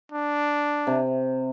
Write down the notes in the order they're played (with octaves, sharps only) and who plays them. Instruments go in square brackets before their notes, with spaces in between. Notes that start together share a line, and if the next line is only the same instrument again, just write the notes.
[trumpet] D4
[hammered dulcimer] C3